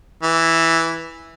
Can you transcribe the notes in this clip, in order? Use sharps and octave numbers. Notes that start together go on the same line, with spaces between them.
E3